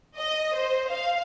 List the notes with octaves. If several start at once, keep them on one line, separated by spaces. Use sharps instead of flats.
D#5
C5
F5